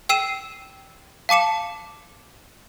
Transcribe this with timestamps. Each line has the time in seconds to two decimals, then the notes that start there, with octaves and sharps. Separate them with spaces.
0.09 G5 E6 C7 D#7 E7
1.29 F5 A5 D6 C#7 E7